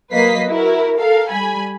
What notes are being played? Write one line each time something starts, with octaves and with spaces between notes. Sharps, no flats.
F#3 A#3 B4 D#5 B6 C7
E4 F#4 A#4
A4 A#4 F5
G3 G#5 B5